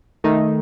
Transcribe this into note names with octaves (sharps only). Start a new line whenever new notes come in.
D#3 A3 D#4